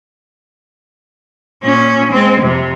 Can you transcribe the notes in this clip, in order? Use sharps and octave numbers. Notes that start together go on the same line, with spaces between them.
A#2 C#4
G#3 C4
F2 C3